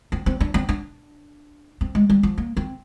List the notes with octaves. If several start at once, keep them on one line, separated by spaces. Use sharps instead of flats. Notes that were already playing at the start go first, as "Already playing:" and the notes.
C4
C4
D4
C4
D4
C4
G#3
G3
F3
A#3
C4